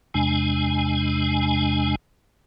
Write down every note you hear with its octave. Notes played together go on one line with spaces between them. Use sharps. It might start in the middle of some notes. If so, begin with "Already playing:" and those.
E2 C3 G#3 D4 G#5